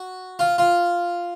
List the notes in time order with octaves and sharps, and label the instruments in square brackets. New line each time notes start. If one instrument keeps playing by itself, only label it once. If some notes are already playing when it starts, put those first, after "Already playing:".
Already playing: [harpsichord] F#4
F4
F4